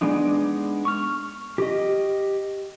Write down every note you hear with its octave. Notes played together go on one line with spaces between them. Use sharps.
G#3 B3 D4 D#4
C#6 F6
G4 D#5